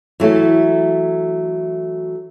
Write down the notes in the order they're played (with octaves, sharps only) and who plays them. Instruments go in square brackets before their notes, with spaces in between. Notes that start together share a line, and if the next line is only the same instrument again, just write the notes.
[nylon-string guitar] E3 F#3 A3 A4